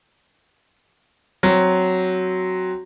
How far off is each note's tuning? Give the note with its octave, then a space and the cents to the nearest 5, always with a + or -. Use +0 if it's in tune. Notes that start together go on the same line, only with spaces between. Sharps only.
F#3 +0 C4 +0